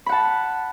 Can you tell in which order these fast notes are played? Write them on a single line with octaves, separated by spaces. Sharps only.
B5 F#5 A5